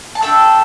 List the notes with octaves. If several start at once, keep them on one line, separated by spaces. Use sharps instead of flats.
A5
A3 D4 A4 E5 G5